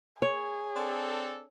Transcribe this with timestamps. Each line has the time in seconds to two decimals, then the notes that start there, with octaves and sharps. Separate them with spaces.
0.22 G#4 C#5
0.76 C4 D4 A4